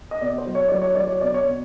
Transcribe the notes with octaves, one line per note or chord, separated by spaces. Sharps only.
D#5
B2 D5
C5
F#3
C#5
F#3 D5
C#5
F#3 D5
C#5
B2 D5
C#5
B2